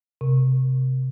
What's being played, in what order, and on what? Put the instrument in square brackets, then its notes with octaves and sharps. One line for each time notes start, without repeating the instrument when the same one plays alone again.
[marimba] C3